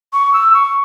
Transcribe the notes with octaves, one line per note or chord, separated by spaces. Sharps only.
C#6
E6
C#6